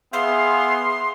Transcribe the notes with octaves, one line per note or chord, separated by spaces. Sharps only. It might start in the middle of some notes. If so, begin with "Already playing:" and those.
B3 G#4 E5 F5 C6